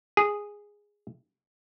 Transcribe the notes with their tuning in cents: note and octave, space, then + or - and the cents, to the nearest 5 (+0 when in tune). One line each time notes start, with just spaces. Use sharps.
G#4 -10